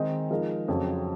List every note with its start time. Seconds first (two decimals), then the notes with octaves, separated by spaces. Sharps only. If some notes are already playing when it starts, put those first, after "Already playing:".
Already playing: D#3 G#3 C4 D#4 G#4
0.30 F3 G#3 D#4 A#4
0.68 F2 C#3 F#3 C4